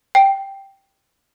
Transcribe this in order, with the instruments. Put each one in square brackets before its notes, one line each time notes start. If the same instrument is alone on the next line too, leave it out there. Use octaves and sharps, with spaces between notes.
[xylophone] G5